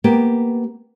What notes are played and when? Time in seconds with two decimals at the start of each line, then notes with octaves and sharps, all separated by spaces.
0.04 A#3 B3 G4